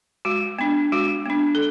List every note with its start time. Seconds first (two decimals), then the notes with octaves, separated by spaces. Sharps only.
0.25 G#3 F#4
0.59 B3 D4
0.92 G#3 F#4
1.26 B3 D4
1.55 A4